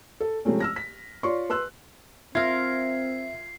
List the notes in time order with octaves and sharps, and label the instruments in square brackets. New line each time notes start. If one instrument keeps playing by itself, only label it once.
[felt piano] A4
C3 F3 G#3 A3 C4 C#4
E6 F6 A#6
B6
F4 C#5 D5 C6 C#6
B4 C6 E6 F#6
[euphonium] C4 [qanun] F4 A#4 [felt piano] E5 G#6 [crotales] C7